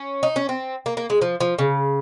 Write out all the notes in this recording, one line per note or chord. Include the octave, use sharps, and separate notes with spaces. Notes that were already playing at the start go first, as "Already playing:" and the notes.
Already playing: C#4
D#4
C#4
C4
A#3
A#3
G#3
F3
F3
C#3